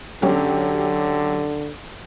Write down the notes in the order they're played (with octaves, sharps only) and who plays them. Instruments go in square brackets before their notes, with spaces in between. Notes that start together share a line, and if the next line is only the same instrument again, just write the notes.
[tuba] D3 [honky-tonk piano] F#3 C#4 G4